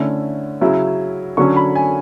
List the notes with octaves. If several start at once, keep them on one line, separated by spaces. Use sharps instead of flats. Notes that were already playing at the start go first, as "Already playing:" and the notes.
Already playing: D3 A3 C#4 E4
C#3 F#3 C#4 E4
D3 F#3 C#4 C#6
B5
G#5